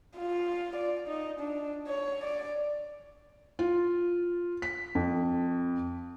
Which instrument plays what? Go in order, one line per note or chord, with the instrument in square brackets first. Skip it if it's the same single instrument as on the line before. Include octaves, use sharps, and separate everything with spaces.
[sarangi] F4
D5
D#4
D4
C#5
D5
[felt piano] F4
B6
F2